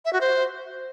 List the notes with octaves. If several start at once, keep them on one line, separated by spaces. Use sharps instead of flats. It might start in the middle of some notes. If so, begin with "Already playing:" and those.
E5
F#4
C5